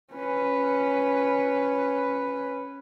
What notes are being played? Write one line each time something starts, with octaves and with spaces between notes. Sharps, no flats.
C#4 B4